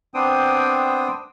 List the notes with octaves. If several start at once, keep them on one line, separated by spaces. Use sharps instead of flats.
B3 C4 D4 C5 G5 D#6